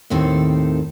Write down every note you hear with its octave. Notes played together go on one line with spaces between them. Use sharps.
D#2 A2 D#3 C4 A4